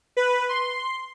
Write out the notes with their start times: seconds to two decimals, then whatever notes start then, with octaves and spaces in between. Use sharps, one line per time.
0.17 B4
0.49 C6